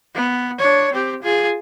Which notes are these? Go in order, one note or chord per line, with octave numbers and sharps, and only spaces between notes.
B3
D4 C#5
C4 G4
F4 G#4